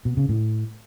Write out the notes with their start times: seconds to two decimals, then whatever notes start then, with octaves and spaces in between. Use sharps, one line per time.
0.05 B2
0.17 C#3
0.29 A2